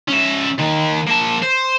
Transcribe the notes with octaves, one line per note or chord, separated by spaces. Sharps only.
C#4 E5
D#3 A#3
A#3 A5
C5